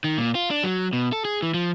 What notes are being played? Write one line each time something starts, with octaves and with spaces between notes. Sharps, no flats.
D#3
A#2
F4
D4
F#3
B2
A4
G#4
E3
F3